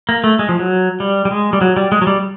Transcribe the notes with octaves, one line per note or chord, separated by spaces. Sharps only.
A#3
A3
G#3
F3
F#3
G3
G3
G#3
G3
F#3
G3
G#3
F#3
G3